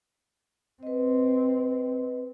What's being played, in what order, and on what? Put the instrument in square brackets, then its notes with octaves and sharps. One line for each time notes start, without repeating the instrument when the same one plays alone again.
[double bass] C4 [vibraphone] B4 D#5